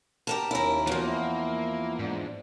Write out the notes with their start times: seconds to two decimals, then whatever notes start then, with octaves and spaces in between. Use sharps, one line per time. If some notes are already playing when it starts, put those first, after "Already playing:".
0.27 G4 A#4 A5
0.51 D#2 C#4 E4 A#4
0.87 E2 F3 A#3
1.04 E4
1.99 G#2 D4